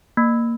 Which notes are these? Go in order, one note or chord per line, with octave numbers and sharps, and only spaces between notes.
A#3